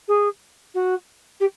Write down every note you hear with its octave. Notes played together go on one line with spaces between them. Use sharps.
G#4
F#4
G4